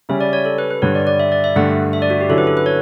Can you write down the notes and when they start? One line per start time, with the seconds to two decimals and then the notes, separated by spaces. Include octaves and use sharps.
0.09 C#3 G3 C#4 E5
0.21 D5
0.33 C#5
0.45 A4
0.58 B4
0.70 B4
0.82 G2 D3 G3 C#5
0.95 D5
1.07 D5
1.20 E5
1.32 D5
1.44 E5
1.56 G2 D3 A3 D4 F#5
1.93 E5
2.02 D5
2.10 F#4
2.21 G4
2.29 D3 F#3 C#4 E4 A4
2.38 B4
2.47 A4
2.57 B4
2.66 C#5